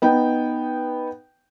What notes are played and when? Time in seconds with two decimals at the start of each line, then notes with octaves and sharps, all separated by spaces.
0.02 B3 D#4 G5